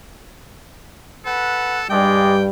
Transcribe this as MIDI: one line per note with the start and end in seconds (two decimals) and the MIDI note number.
1.25 1.89 69
1.25 1.83 71
1.25 1.83 78
1.90 2.50 43
1.90 2.50 55
1.90 2.36 56
1.90 2.36 74
1.90 2.44 79